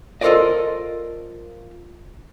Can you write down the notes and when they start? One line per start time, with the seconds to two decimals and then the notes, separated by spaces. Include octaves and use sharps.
0.21 F4 A4 A#4 C5 D5 D#5